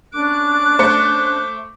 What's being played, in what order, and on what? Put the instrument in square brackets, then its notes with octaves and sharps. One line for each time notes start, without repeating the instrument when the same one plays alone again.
[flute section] C#4 D4 F#6 [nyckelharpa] D6
[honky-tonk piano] A3 C5 C#7